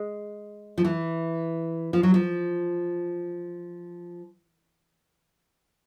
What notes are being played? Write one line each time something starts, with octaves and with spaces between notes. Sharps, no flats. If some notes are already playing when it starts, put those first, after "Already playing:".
Already playing: G#3
F3
E3
F3
F#3
F3